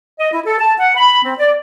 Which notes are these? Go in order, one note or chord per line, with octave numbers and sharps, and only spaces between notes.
D#5
E4
A4
A5
F#5
B5
C4
D5